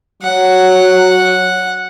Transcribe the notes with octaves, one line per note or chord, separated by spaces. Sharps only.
F#3 F#5